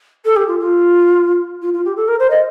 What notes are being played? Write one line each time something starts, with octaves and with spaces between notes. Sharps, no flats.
A4
G4
F4
F4
F4
F4
G4
A4
A#4
C5
D#5